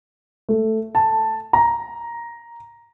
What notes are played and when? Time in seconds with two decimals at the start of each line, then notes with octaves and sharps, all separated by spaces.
0.49 A3
0.95 A5
1.53 A#5